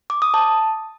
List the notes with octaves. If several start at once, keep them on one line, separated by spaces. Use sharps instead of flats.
D6
D#6
A5